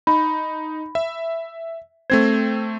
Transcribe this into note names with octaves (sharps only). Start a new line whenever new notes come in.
D#4 B5
E5
A3 C4 C5 G#6